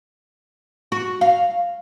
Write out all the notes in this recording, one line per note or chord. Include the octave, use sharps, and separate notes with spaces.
F#4
F5